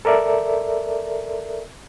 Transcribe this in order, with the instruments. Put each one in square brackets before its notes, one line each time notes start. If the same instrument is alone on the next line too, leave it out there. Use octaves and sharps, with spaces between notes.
[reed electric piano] A4 A#4 D5 E5